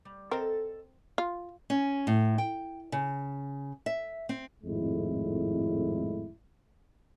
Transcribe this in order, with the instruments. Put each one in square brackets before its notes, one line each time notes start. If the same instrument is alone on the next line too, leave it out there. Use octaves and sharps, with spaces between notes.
[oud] G3
[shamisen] C4 A#4 [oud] A4 D#5
[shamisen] F4
[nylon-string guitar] C#4
A2
G5
C#3
E5
C4
[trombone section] G#1 F2 A2 G#3 E4